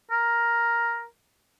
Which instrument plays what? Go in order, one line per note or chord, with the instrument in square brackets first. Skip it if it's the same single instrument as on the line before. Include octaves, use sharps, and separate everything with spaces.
[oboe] A#4